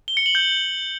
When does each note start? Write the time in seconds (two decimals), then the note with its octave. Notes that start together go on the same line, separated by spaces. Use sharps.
0.08 G7
0.17 C#7
0.26 F#7
0.35 G6